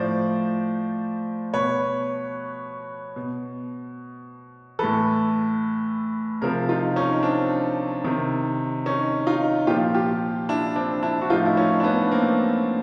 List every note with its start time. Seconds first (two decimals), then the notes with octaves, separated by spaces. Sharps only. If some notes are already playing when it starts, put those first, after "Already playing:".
Already playing: A2 F3 C5 D5
1.54 B2 B4 C#5
3.16 B2
4.79 A2 E3 A4 B4
6.41 C3 F3 G#4 A#4
6.69 D#4 F4
6.96 C#4 D#4
7.23 C4 D4
8.04 C3 D#3
8.86 C#4 D#4
9.27 D#4 F4
9.67 A#2 F3 F4 G4
9.94 F4 G4
10.49 D4 E4
10.76 C4 D4
11.03 D4 E4
11.21 F#4
11.30 A2 F3 D#4 F4
11.46 E4
11.57 C#4 D#4
11.80 D4
11.84 B3 C#4
12.11 A#3 C4